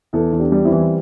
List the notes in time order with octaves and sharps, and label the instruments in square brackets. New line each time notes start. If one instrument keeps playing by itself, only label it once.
[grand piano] E2 [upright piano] E4 A4
[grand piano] E2
[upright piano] D4 G4
[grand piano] G3
[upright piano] C4 E4
[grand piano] E3